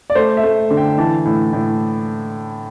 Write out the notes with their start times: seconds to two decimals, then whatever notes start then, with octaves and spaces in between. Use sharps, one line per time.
0.10 D5
0.15 A3 C5
0.37 E5
0.43 A3
0.71 D3
0.77 G5
0.98 E3 A5
1.25 A2
1.53 A2